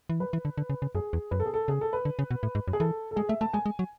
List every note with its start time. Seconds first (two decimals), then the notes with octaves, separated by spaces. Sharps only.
0.10 E3
0.20 F#3 B4
0.33 E3
0.45 D3
0.58 D3
0.70 C#3
0.82 C#3
0.95 F#2 G#4
1.13 E2
1.31 F#2 B4
1.40 A4
1.46 G#4
1.54 A4
1.68 C#3 G#4
1.81 A4
1.93 B4
2.05 D3
2.19 C#3
2.31 B2
2.43 A2
2.55 G#2
2.68 F#2
2.73 G#4
2.80 E3 A4
3.11 A4
3.16 G#3 G#4
3.29 A3 E5
3.41 A3 A5
3.53 G#3 G#5
3.66 G#3
3.79 F#3